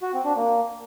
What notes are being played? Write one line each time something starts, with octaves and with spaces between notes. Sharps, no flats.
F#4
C4
D4
A#3